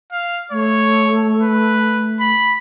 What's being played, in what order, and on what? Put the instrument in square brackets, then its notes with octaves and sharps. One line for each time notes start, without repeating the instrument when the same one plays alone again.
[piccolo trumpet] F5
[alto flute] A3 [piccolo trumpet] C#5
[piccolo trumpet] B4
B5